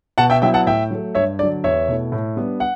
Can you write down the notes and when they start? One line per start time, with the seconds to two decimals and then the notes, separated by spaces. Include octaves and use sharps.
0.18 B2 F#5 A5
0.30 E5 G5
0.42 F#3 B3 E4 E5 G5
0.54 F#5 A5
0.66 A2 E5 G5
0.91 F#3 A3
1.15 G2 C#5 E5
1.39 D3 F#3 D5
1.64 E2 C#5 E5
1.88 B2 A3 E4
2.12 A2
2.36 G3 B3 D4
2.60 F#5